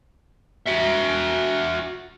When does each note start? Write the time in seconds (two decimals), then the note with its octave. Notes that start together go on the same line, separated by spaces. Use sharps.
0.66 F#4 E5